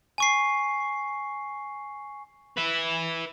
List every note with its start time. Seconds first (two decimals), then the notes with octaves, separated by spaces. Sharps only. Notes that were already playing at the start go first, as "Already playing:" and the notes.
0.18 G#5 C#6 C7
2.57 B4 E5